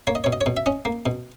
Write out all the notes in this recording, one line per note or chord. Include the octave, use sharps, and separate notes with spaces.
A#3 C#5
D#5
B2 C#5
D#5
C#5
B2
E5
C#4 D#5
A#3
B2